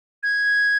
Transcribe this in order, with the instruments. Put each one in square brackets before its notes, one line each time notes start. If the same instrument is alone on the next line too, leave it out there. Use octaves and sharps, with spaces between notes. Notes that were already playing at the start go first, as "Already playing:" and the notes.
[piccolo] G#6